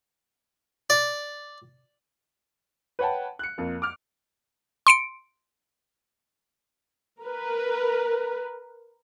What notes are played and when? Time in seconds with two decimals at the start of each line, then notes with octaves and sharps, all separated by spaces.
0.90 D5
2.99 B4 C#5 F#5 G5 A5
3.39 F#6 C#7
3.58 F2 A#3
3.82 D6 F6
4.87 C6 C#7 D7
7.22 A#4 B4